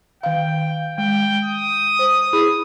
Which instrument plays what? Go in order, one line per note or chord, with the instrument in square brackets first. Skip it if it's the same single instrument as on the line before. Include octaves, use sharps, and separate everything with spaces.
[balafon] D#3 F5 [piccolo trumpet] G5
[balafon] G#3 [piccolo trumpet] G5
[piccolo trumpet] D#6
[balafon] C5
E4 G#4 B5